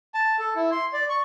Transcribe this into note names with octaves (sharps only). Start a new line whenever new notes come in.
A5
A4
E4
C6
D5
C#6